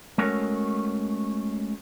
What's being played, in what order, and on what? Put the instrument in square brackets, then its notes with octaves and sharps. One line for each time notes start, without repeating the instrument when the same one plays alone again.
[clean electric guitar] G#3 A3 C#4 F#4 A#4 C#5